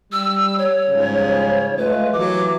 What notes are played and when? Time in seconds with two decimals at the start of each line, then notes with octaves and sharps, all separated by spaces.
0.12 G3 E6
0.58 C#5
0.89 G#2 C#3 F3 G3
1.78 G#3 A3 F4 B4
2.13 D#2 E3 F#3 D6